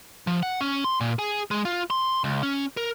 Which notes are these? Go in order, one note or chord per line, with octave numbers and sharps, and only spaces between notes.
F3
F#5
C#4
C6
A#2
G#4
G#3
F4
C6
C#2
C#4
A#4